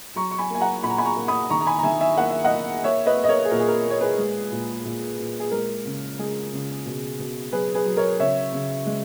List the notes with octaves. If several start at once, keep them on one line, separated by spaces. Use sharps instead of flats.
F#3 A#5 C#6
C#6
G#5 B5
A#3 G#5
F#5 A#5
A#2 B5
A#5
G#5 B5
A#5 C#6
A#3
B5 D#6
D#3 A#5 C#6
A#5
G#5 B5
A#5
D#3 E5 G#5
E5 G#5
A#3 F#5
E5
D#5 F#5
A#3
A#3 C#5 E5
B4 D#5
A#3
D#5
A#4 C#5
G#4
A#2 A#4
G#4
A#4
A#3
C#5
G#4 B4
G#3
A#2
A#2
A#2
G#4
G#3 A#4
C#3
G#3 G#4
C#3
B2
B2
F#3 G#4 B4
G#4 B4
F#3
A#4 C#5
C#3 C#5 E5
C#3
G#3